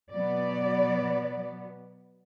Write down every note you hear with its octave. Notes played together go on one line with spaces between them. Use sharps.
B2 F#3 B3 D5